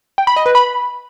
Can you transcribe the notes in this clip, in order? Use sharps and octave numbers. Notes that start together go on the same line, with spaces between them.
G5
B5
D#5
B4
B5